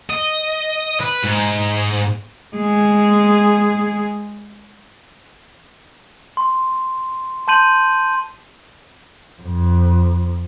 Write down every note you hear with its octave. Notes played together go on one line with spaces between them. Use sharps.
D#5
B4
G#2
G#3 G#4
C6
A5 C6 G6 D#7 F#7
F2